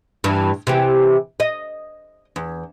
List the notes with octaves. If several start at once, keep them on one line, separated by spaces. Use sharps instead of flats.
G2 E3
C3 E3 G4
D#5
E2